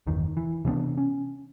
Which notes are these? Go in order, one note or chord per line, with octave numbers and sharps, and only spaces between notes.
G1 E2 D#3
E3
C3 E3 B3 D4
C#4